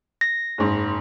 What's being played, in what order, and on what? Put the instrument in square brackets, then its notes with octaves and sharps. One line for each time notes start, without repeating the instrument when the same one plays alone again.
[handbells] A#6
[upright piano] F#1 G#2